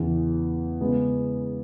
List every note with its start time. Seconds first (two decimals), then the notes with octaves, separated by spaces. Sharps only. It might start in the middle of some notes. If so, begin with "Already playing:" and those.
Already playing: E2 C#3 E3
0.81 C#3 G#3 B3